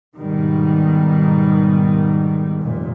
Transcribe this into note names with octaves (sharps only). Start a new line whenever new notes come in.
G#2 B2 D#3 G3
F1 A#2